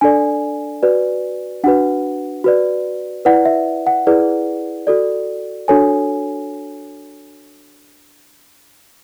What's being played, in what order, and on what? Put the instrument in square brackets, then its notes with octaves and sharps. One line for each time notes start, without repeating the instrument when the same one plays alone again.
[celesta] D4 A4 D5 G#5
F#4 B4 D5
D4 F#4 B4 F#5
F#4 B4 D5
E4 B4 D5 F#5
E5
F#5
E4 G#4 B4 D5
F#4 A4 D5
D4 F#4 A4 C#5 G#5